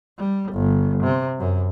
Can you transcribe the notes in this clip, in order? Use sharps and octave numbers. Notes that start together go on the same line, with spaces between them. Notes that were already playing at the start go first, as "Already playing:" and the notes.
G3
G1
C3
F#2